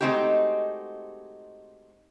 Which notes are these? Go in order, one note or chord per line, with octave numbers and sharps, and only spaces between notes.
G#3 A3 C4 D#4 F#4 G4